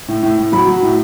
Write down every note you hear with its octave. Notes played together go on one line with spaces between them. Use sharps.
A2
A2
A2
F#3 B5
F#3
A2